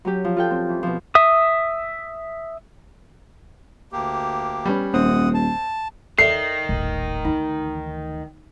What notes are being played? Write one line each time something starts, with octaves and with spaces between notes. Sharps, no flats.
F#3 C#4 G4
F3
F4 A4 G5
C4
E3
B2 F3
E5 D#6
D2 A#3 G4
G3 B3 C#4
D#1 F#2 C4 F#5 D#6
A5
D#2 D#3 A4 D5 E5 C7
D#1 A1
D2 E3 D#4